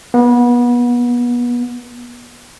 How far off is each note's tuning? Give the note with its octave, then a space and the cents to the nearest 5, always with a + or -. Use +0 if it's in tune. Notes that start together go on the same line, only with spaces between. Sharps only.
B3 -30